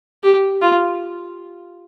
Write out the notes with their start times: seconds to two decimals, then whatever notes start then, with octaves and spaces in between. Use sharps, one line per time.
0.23 G4
0.62 F4